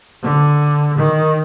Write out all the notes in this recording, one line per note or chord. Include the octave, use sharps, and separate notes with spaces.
D3
D#3